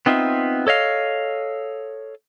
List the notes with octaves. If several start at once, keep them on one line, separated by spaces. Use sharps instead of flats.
B3 C4 D#4 F4 E5
A4 C#5 D#5 F5